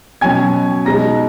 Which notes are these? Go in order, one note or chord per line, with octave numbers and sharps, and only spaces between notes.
B2 F#3 C#4 G#5 G#6
B2 G#3 D#4 A#5 A#6